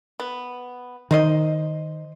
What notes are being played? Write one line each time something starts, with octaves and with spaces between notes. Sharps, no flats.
B3
D#3 D#4 C5 D#5